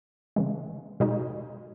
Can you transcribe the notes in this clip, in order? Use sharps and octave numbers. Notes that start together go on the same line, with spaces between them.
C#3 E3 G#3
B2 G#3 D#4 F#4